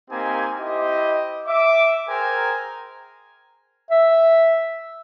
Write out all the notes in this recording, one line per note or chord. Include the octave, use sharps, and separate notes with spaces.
A#3 C4 D#4 G4 G#5
E4 G4 C5 D#5
E5 D6
G#4 A#4 C5 G5 G#5 A#5
E5